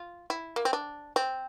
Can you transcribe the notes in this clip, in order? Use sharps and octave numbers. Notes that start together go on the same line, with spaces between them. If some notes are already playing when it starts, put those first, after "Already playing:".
Already playing: F4
E4
A#3
C4
D4
C4